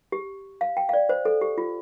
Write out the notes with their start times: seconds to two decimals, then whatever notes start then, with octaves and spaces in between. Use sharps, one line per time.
0.12 G4
0.61 F5
0.77 G5
0.89 F5
0.93 D5
1.09 C5
1.25 A4
1.41 G4
1.58 F4